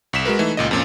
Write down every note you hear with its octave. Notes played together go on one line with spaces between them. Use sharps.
C2 B6 E7
G#3 F#4 A#4 B4
E3 A3 D#4
C#2 A#2 D#5
F2 A#2 C#4